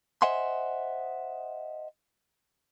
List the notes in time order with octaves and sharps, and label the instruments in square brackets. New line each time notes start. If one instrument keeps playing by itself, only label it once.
[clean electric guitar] C5 D#5 E5 F#5 G#5 C6